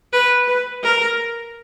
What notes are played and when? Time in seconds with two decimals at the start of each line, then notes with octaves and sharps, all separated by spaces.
0.13 B4
0.47 B4
0.83 A#4